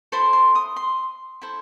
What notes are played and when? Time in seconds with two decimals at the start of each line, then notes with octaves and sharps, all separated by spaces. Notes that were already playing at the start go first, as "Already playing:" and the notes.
0.12 E4 A4 C5 C6
0.33 C6
0.55 D#6
0.76 C6
1.42 E4 A4 C5